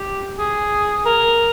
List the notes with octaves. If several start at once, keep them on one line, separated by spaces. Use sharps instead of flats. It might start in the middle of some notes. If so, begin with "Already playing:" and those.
Already playing: G4
G#4
A#4